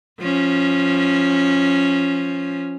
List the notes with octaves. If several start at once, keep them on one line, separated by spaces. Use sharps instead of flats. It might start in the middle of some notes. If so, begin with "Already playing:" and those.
F3 C#4